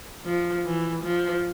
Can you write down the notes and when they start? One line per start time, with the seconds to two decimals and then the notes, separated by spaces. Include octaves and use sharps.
0.25 F3
0.65 E3
1.03 F3